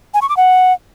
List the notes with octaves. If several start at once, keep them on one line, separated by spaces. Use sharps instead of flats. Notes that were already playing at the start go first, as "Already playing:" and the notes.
G#5
C#6
D6
F#5